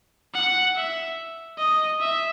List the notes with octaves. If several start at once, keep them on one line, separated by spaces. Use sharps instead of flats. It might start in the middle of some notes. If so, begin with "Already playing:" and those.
F#5
E5
D#5
E5